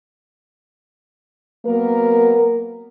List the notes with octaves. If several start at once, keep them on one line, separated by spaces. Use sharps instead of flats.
F#3 A#3 B3 A#4